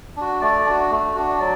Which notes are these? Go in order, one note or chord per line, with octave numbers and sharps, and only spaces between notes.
D4 F#4
A3 D5
D4 F#4
A3
D4 F#4
F#3 D5